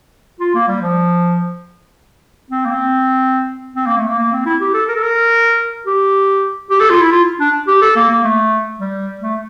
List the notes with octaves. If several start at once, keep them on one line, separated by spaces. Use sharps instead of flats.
F4
A#3
G3
F3
C4
A#3
C4
C4
A#3
A3
A#3
A#3
C4
E4
G4
A4
A#4
A4
A#4
G4
G4
A4
F4
E4
F4
D4
G4
A4
A#3
A#3
A3
G3
A3